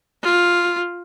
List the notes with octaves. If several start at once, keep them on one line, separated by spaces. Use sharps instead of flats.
F4